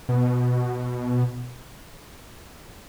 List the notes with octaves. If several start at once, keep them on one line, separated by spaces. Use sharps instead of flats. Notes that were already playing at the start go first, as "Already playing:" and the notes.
B2